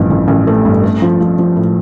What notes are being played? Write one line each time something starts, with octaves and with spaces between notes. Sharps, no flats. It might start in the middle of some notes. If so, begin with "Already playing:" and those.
Already playing: A1 G2 F3
A1
A1
A3
G2
A3
F3
F3
F3
A2